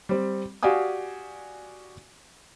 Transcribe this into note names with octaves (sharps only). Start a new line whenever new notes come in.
G3 C4
F#4 G4 D5 F5 G#5 D#6